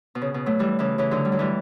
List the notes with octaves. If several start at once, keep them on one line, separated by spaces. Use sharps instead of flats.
B2
C#3
B2
F#3 A3
E3 G3
C#3 E3
C#3 E3
D3 F#3
G3
F#3
E3 G3